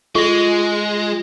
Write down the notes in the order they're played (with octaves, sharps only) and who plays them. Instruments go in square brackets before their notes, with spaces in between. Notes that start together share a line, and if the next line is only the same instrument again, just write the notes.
[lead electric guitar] G#3 [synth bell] F4 A#6